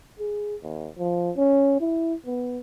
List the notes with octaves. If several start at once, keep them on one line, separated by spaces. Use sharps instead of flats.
G#4
D#2
F3
C#4
E4
B3